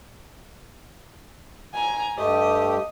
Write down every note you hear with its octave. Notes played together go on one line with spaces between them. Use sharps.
G#5 A#5
G2 A3 G4 D#5